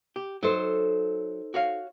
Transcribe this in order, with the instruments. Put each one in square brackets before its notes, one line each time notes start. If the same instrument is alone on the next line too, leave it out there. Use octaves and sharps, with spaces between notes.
[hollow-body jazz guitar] G4
[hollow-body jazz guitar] F#3 [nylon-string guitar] D#4 A4 C5
[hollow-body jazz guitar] F#4 C#5 F5